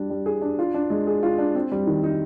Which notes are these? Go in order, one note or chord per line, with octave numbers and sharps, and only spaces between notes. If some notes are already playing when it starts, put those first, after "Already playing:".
Already playing: G3 D4
G3
G#4
D4
F4
D4
G#3
G#4
F4
D4
C4
G3
D#3
D#4